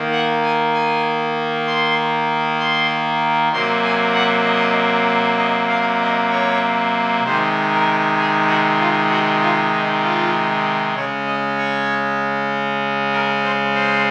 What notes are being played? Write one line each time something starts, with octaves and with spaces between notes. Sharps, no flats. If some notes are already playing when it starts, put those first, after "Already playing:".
Already playing: D#3 A#3
F#5
G#5
G#5
C6
C6
C3 F#3 A#3 C6
G#5
F#5
D#5
D#5
F5
D#5
C#5
C3 D#3 G#3 C5
A#4
G#4
F#4
F4
F#4
F4
D#4
F4
C#3 G#3 C#5
D#5
C#5
A#4
C5
C5